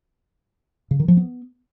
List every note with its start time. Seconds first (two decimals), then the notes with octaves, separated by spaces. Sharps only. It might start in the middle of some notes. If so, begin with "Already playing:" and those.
0.91 C#3
1.00 D#3
1.08 F3
1.17 B3